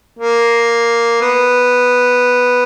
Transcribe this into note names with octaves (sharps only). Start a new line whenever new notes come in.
A#3
B3